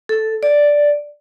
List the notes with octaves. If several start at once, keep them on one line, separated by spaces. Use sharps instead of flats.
A4
D5